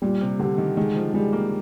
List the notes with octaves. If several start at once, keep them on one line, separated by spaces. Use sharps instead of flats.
A#2 G3
C3
D3 G4
D#3
D#3 G#3
F3
G3 G#3
A#3